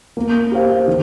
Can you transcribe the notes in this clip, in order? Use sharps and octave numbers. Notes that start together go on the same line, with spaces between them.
A#3
G4 C5 F5
D#3